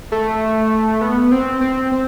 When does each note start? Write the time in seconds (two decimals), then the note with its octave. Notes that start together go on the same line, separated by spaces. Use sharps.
0.12 A3
1.01 B3
1.32 C4
1.61 C4
1.92 C4